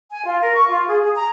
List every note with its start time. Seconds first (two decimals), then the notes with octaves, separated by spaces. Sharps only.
0.10 G#5
0.26 F4
0.41 A#4
0.56 C#6
0.67 F4
0.87 G#4
1.01 G#4
1.14 A#5